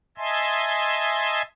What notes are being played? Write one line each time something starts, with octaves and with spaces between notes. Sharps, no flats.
D#5 E5 G#5 A5 C6